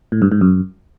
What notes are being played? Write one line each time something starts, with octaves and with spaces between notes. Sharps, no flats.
A2
G2
G#2
F#2